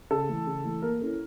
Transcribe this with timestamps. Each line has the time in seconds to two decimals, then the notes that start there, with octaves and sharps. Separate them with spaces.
0.11 C#3 A4
0.29 E3 A3
0.47 C#3
0.64 E3 A3
0.82 A#3 A#4
1.00 C#4 E4 A4